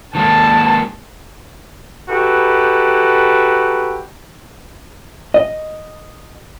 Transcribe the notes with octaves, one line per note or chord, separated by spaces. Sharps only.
D#3 G#3 A#3 A5
D#4 F#4 G4 A4 B4
D#5